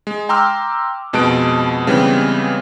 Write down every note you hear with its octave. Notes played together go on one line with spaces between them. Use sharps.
G#3
G5 A#5 C6 D6 E6 F6
F2 B2 G#3 A5 F#6 D7
C#3 E3 G3 G#3 B3 C4